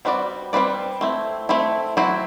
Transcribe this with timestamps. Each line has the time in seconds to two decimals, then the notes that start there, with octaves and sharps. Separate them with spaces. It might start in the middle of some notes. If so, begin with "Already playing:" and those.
0.05 G3 C4 F#4 B4 D5
0.53 G3 C4 F#4 B4 D5
1.01 A3 C4 E4
1.49 A3 C4 E4
1.97 F#3 C4 E4